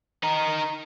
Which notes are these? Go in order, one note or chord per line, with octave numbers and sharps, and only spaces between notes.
D#4 A#4